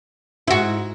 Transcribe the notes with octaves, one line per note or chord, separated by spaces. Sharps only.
G#2 E4 F#4